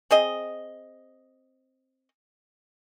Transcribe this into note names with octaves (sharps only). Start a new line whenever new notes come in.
C4 G#4 D#5